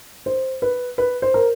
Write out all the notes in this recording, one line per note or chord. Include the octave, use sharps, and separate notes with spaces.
C5
B4
B4
C5
A#4